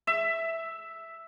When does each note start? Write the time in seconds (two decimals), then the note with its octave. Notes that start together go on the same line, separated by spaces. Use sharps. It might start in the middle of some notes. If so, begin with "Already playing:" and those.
0.07 E5